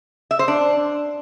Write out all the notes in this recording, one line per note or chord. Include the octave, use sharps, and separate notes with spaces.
E5
C5
D4